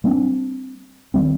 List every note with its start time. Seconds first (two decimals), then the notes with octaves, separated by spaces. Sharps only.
0.04 G3 A#3 C4 D4
1.14 D#3 F#3 G3 C4